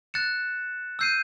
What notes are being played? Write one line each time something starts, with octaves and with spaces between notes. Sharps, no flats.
F#6 A6 C#7 E7
E6 G6 C7 D#7